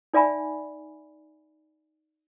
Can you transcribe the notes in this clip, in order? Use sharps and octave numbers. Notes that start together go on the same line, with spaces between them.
D#4 D5 E5 G#5 B5